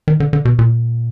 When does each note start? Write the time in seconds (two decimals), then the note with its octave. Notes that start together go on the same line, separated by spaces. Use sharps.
0.08 D#3
0.20 D3
0.33 D3
0.45 B2
0.59 A#2